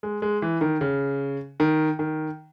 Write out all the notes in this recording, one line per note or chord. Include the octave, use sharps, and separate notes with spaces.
G#3
G#3
E3
D#3
C#3
D#3
D#3